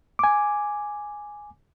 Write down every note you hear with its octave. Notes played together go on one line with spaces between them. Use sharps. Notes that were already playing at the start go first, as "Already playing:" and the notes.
G#5 D6